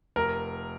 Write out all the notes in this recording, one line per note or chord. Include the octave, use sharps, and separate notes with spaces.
F1 A#4